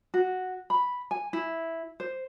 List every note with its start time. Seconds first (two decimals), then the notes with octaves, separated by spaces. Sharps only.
0.14 F#4
0.70 B5
1.11 G#5
1.33 E4
2.00 C5